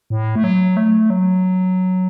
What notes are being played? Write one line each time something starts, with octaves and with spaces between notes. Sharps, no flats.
A2
A3
F#3
A3
F#3